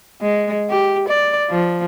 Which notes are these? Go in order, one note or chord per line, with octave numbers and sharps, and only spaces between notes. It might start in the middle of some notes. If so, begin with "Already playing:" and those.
G#3
G4
D5
F3